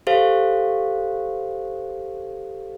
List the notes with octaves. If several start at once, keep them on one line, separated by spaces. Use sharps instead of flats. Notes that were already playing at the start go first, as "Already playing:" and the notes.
G4 A4 C5 F5